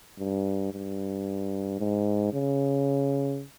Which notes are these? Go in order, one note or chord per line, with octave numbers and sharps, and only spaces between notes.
G2
G2
G#2
C#3